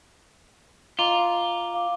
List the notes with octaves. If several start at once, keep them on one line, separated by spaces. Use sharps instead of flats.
F4 D#5 A#5 D6
F5 D6